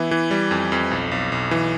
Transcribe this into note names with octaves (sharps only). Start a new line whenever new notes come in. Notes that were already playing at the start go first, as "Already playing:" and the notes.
Already playing: E3 B3 E4
E3
G3
F2
F2
B1
B1
B1
E3